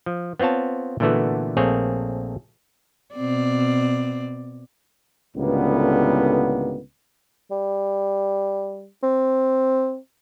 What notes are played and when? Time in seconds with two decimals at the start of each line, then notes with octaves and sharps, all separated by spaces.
0.06 F3
0.40 B3 C4 F4 C#5 A5
1.00 A#2 D3 E3 A3 B3 F#4
1.57 A#1 A3 A#3 C4 G#4 C#5
3.15 B2 C4 D5
5.36 C#2 A2 D3 G3 A#3 B3
7.51 G3
9.03 C4